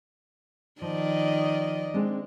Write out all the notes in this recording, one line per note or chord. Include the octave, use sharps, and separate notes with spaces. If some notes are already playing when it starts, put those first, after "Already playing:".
D#3 F3 D5 D#5
G#3 C4 D4